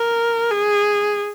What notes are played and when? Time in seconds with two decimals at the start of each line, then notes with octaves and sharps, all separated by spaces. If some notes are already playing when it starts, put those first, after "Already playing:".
Already playing: A#4
0.51 G#4